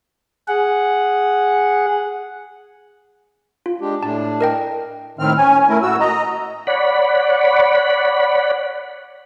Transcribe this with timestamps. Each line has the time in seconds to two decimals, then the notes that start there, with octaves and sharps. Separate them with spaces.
0.48 G#4 F#5
3.66 F4
3.81 G#3 D4 G4
4.03 A2 D4 A5
4.41 A#4 D#5 G5
5.19 A2 D#3 C4 F6
5.37 C#4 G#5
5.69 A3 E4 A#4
5.82 A2 F#4 E6
6.00 D#5 A#5
6.67 C#5 D5 F#5 B5